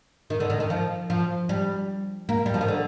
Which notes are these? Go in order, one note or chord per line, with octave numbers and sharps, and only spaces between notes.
D#3
D3
D#3
D#3
F3
F3
G3
A#3
G3
F3
D#3
D3